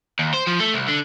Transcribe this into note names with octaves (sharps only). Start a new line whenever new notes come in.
D#2
C5
F3
A3
C2
D3